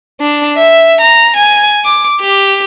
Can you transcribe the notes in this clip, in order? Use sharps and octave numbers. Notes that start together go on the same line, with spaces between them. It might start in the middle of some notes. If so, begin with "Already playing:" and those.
D4
E5
A#5
G#5
D6
G4